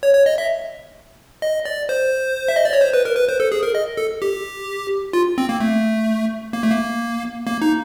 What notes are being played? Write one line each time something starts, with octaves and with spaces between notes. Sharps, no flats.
C#5
C#5
D#5
E5
D#5
D5
C5
E5
D#5
D5
C#5
C5
B4
A#4
B4
C5
A4
G#4
A#4
D#5
A4
G4
F4
C4
A#3
A3
A#3
A3
A#3
A#3
D#4